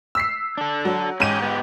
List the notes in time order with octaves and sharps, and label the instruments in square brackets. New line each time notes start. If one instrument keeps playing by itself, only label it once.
[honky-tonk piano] E6 B6 C7
[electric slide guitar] D4 A4
[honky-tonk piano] F#3
[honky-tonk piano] G#2 D#7 [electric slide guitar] C#4 G4
[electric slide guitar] B3 G4